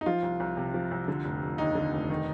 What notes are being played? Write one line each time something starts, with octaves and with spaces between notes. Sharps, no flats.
D#4
F3 F4
C2
C2
C3
F3
C2
D3
F1
F1
D#2 D#4
D3
F1
D#3